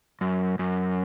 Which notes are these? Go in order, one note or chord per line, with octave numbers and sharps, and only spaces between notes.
F#2
F#2